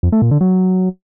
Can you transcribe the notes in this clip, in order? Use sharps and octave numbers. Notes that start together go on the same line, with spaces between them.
F2
A3
A#2
D3
F#3